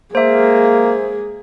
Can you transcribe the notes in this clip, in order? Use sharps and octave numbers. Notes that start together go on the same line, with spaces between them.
G#3 A#3 G#4 C5 E5